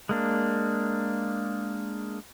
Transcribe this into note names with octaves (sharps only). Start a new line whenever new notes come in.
G#3 A#3 D4